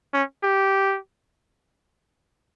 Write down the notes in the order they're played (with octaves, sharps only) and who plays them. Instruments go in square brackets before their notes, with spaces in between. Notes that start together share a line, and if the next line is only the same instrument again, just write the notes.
[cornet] C#4
G4